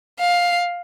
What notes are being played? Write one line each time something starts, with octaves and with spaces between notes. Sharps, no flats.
F5